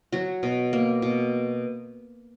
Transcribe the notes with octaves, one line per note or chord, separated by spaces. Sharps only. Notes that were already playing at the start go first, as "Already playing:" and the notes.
F#3 F#4
B2
A#3
B2